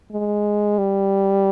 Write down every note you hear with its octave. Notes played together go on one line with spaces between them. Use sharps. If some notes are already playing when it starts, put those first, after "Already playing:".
G#3
G3